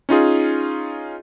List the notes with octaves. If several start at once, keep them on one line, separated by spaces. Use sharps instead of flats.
C#4 D#4 F4 G#4